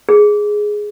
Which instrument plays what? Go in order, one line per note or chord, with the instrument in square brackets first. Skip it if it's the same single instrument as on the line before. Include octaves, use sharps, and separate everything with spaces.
[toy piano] G#4